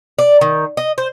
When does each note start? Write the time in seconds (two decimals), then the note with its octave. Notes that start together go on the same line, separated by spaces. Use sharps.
0.19 D5
0.41 D#3
0.77 D#5
0.98 C5